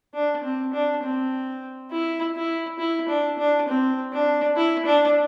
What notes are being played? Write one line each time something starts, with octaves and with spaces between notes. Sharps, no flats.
D4
C4
D4
C4
E4
E4
E4
D4
D4
C4
D4
E4
D4